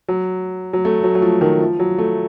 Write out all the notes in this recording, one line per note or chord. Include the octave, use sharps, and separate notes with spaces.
F#3
F#3
A3
F#3
F#3
F3
D#3
F3
F#3
A3